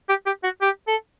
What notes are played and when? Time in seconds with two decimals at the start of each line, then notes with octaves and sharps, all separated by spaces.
0.09 G4
0.26 G4
0.44 F#4
0.62 G4
0.88 A4